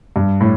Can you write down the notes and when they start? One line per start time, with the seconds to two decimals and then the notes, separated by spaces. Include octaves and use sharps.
0.16 G2
0.41 A2